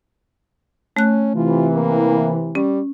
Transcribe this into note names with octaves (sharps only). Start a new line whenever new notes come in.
A3 C#4 F#6
C3 E3 F4
A#3
G3 C#4